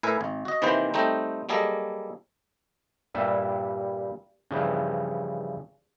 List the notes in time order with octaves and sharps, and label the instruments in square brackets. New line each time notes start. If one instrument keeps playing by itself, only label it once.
[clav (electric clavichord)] A2 A#4 B4 E5 G#5
G#1
F#4 D#5
C3 D#3 E3 A#3 B4 C5
G3 A3 C4 D#4 G5 A#5
F#3 G3 A#3 G#4 A4 D#5
G2 A#2 G3 E5
G2 C#3 E3 F3